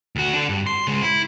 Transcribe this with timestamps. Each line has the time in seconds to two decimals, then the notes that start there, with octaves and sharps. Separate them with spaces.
0.16 D2 F#4
0.33 D4 A4
0.49 G2
0.67 C6
0.87 C#3 G#3
1.01 E4